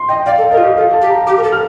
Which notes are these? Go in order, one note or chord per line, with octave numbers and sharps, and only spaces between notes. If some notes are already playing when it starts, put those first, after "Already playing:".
Already playing: C6
D#5 G5
D5 F5
A4
A#4 D#5
F4
G4
A4 F5
A5
G4
A#5
G4 D6
A#4
A4
F6